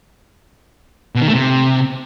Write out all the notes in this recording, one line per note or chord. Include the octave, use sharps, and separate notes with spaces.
B2
D#3
A3
C3